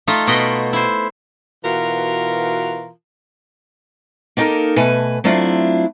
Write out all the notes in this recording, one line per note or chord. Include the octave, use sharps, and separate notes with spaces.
A3 D#4 F4
B2 D#5 B5 C6
E4 C5
B2 E3 F4 F#4 A#4
A#3 B3 D#4 G4 A4 A#4
B2 A3 B4 G#5
F#3 A3 C4 D4 E4 F4